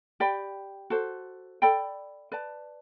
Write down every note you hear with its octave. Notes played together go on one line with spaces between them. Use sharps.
G4 D5 G5 B5
F#4 A4 C5
A4 D5 G5 B5
B4 D5 A5